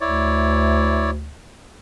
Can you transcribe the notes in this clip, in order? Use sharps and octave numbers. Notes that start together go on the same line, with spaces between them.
D2 E4 C#5 D5